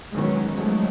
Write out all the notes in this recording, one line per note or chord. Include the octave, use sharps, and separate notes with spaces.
D#3 E3 F#3 G#3 B3 C#4
F3 F#3 G#3 A3